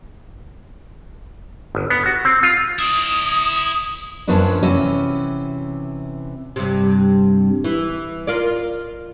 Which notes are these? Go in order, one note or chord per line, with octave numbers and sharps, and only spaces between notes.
G1
B3
F#4
C4
F4
E4 D5 D#6
F#2 F3 F#3 B3 D4
C3 E3 C#4 F#4
G2 C3
E3
F4 A#4 D5